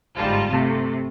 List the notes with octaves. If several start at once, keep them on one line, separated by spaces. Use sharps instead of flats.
G1 G#2 G3 F4 A5
C3 A3